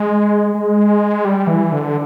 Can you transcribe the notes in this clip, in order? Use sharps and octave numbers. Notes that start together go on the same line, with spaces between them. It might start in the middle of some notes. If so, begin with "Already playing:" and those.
Already playing: G#3
G#3
G3
E3
D3